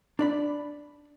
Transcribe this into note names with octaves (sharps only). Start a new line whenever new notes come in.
D4 D5 B5